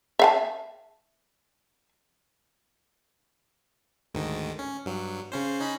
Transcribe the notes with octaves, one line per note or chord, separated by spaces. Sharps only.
E5 F5 A5
D2 G#2 D#3
C#4
G2 F#3
C#3 C#4 C5
C#4 D#4 B5